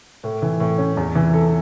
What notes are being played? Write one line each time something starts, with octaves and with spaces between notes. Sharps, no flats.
A2
E3
A2
C#4
E2
E3
A4